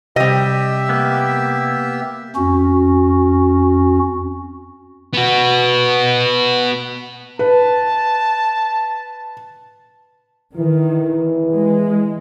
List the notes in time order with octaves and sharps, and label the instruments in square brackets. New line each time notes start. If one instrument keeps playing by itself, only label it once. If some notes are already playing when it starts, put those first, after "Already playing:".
[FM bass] C3 [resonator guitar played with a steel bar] G3 D#5 [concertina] G4 E5
[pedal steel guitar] A#3 B3
[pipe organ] F2 C#4 F#4
[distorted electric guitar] B3 F#4
[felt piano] B4 [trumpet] A5
[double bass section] D#3 [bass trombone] E3
[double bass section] G#3